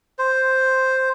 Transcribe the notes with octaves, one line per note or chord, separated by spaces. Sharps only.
C5